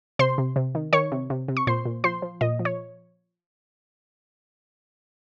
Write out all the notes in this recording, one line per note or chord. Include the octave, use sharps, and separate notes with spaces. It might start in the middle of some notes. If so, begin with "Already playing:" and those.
C3 C5 C6
C3
C3
D#3
D#3 C#5 C#6
C3
C3
C3
C#6
A#2 C5 C6
A#2
F3 C5 C6
F3
A#2 D#5
F3
C#5